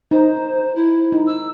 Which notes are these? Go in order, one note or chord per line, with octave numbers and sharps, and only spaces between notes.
D#4 C5
E4
D#4
E6